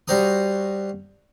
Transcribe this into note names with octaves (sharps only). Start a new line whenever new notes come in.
G3 F#4 C5 A#5 D#6